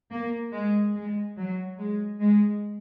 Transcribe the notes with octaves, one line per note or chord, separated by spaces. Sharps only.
A#3
G#3
G#3
F#3
G#3
G#3